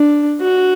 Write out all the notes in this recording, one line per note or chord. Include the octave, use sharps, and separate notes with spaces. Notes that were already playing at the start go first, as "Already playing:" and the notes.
Already playing: D4
F#4